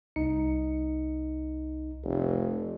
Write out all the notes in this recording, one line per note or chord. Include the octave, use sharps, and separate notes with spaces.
C2 D#4 C#7
F1